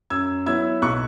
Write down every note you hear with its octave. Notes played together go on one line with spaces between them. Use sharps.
F#2 E6 G#6
F#3 B3 E4 E6 G#6
B1 C#6 F#6